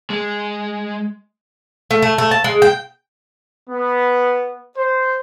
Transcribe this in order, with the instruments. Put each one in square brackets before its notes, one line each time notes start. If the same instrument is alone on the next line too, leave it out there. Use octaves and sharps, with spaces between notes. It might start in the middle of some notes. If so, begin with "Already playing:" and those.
[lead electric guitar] G#3
[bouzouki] A3
A3
A3
A5
G#3
G5
[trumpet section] B3
C5